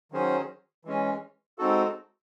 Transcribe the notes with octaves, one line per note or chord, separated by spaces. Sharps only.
D#3 F#3 C#4 G#4 C5
E3 G#3 C#4
G#3 C4 D#4 F#4 A4